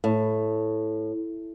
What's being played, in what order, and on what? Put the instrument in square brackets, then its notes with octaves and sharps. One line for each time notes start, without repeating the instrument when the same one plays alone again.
[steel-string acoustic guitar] A2